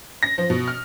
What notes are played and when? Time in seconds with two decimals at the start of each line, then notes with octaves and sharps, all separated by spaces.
0.23 A#6
0.38 F3
0.50 B2
0.68 F6